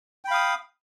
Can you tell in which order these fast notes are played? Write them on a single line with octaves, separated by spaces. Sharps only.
G5 B5 F5 D#6